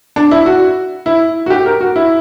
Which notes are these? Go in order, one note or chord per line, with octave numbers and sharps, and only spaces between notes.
D4
E4
F#4
E4
F#4
G4
A#4
F#4
E4